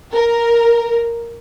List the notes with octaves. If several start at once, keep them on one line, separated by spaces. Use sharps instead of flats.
A#4